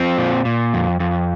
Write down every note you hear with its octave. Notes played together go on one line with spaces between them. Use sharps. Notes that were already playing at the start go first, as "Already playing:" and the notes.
Already playing: F3 C4
A#2
A#2
F2
F2